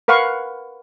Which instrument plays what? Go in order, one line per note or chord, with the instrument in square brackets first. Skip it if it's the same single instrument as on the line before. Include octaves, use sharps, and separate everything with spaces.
[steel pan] A#4 B4 F5 F#5 C#6